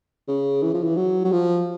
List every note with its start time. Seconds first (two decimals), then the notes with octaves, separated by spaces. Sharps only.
0.28 C#3
0.62 E3
0.73 F3
0.83 E3
0.97 F#3
1.24 F#3
1.32 F3